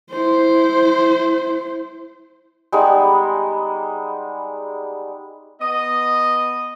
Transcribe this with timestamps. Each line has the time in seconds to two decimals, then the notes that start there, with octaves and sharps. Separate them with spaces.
0.11 E4 C5
2.72 G3 G#3 B3 D#4
5.61 B3 D#5